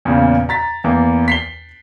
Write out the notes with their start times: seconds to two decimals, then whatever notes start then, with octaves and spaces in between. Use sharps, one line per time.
0.05 E2 A#2 C#3
0.49 A#5 A6 B6
0.84 E2 E3 A#3
1.28 B6 C7 G7